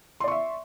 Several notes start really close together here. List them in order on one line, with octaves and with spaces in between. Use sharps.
C6 D5 C#6 E5